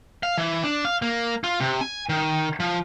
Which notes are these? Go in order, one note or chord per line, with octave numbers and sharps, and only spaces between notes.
F5
E3
D4
F5
A#3
F4
C3
G#5
D#3
F3